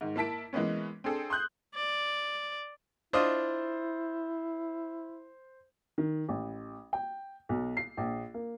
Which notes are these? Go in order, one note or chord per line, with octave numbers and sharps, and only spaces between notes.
G#2 D#3
A#3 E4 A5 B6 D7
E3 G#3 A#3 B3 C#4
C4 D4 G#4 A4
C6 D#6 F#6 G6
D5
D4 E4 F4 C5 D#5
D#3
A1
G5
B1
C7
A#1
A#3